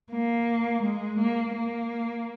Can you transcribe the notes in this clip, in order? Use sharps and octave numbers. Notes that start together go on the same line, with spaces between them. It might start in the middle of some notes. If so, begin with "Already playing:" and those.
A#3
G#3
A#3
A#3